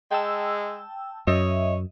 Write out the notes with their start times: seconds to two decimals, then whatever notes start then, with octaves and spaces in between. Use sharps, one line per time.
0.11 G#3 G5 A5 E6
1.27 F#2 C#5 D#5 E5